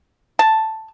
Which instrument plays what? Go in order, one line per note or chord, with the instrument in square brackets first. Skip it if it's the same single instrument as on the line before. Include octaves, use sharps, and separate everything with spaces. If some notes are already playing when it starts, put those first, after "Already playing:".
[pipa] A5